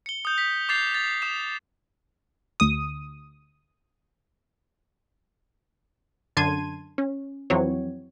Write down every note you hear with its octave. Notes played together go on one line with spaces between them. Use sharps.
C#7 G7
D#6 G6
B6
D6 G6 A6 C7 F7
A6
D#6 E7
D2 D#6
F#2 D3 A5 C6 G#6 D#7
C#4
F2 E3 F#3 C4 C#5